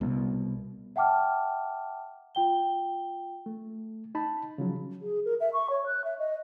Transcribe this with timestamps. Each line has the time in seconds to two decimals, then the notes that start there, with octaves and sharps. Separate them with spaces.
0.01 C2 B2
0.96 E5 F#5 G5 A5 D6 F6
2.35 F4 G5 G7
3.46 A3
4.15 D#4 A5 B5
4.58 C#3 F3 F#3
5.02 G#4
5.25 A#4
5.40 E5
5.53 C#6
5.70 C#5
5.86 F#6
6.04 E5
6.19 D#5